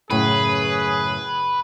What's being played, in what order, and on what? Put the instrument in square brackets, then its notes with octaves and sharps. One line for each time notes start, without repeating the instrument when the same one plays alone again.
[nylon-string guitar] F#2 A2 C#3 [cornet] G#4 [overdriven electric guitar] B4